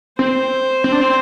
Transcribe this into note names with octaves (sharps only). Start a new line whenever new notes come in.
C4 C5
C4
D4
C4